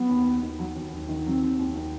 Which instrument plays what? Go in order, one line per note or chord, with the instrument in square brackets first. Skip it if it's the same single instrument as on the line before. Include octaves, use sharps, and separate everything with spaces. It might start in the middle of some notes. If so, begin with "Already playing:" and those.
Already playing: [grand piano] F#3 [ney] B3
[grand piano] D#2
D#2
D#3
F#3
D#2
D#2
D#3
[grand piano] F#3 [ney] C4
[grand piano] D#2
D#2
D#3